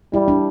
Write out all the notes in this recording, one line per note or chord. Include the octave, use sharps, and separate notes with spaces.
G3 E4
D4